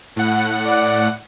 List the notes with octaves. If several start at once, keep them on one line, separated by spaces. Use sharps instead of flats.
A2 F#5
D5